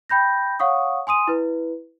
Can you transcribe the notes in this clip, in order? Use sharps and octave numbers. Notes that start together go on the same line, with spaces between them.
G5 B5 G6 A#6
C#5 F5 F#5 C#6 D#6
G#5 C6 D#6 D#7
E4 B4